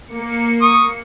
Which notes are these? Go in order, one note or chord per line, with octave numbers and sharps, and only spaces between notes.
A#3 C#7
C#6 D#6